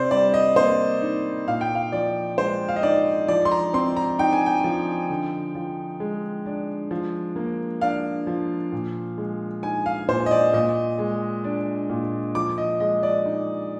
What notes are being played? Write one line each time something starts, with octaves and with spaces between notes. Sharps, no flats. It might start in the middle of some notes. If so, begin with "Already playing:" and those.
Already playing: C3 C5 D5
G3 D5
D#5
A#3 C5
D#4
A#2 F5
G5
F5
F3 D5
G#3 C5
F5
D#5
D#4 D5
F3 D5
C6
A#5
C4 C6
A#5
D#4 G5
G#5
G5
F3
D3
F3
G#3
D4
F3
A#3
D4 F5
F3
A#2
G#3
D#4 G#5
F5
A#2 C5
D#5
D5
A#2 D#5
G#3
D4
A#2
F3 D6
D#5
G#3 D#5
D5
D#4